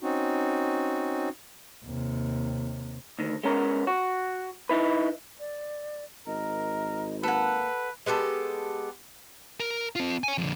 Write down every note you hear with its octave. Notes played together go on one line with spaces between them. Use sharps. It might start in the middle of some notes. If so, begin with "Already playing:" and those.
C4 C#4 D#4 F#4
D#2 C3
D2 D#3
G#3 B3 C#4 A#4
F#4
D#4 E4 B4
D5
G#1 A#4 D#5
A#3 A4 B4 F#5
G#3 B3 G4 A4
A#4
C4 F4
C#5 G#5
F2 D3